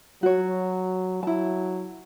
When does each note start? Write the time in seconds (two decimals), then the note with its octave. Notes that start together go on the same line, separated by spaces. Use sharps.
0.23 F#3 F#4 C#5
1.23 F#3 E4 A5